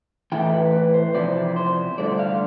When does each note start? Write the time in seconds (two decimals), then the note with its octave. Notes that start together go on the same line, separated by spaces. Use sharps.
0.32 A2 E3 A3 E4 G5
0.52 B4
0.73 B4
0.94 C5
1.15 C3 F3 C4 E4 D5
1.56 C5
1.98 G2 D3 A3 D5
2.19 F5